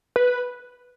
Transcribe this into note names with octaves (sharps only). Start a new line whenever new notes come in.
B4